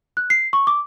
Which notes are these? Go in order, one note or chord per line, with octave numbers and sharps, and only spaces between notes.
F#6
C7
C#6
D6